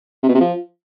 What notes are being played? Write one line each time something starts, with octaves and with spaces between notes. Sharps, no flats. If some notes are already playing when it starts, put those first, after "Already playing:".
C3
B2
C3
F3